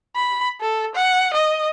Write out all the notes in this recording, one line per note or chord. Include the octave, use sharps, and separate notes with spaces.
B5
A4
F#5
D#5